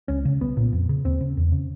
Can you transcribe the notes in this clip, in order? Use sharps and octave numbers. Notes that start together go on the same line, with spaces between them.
C#2 C#4
C#3
C2 B3
A#2
F2
C#3
D#2 C4
C#3
E2
C#3